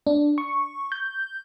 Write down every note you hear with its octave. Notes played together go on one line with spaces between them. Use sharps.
D4
C#6
G6